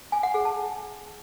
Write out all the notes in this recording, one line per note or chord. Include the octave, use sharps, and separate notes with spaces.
G#5
F#5
G#4
A5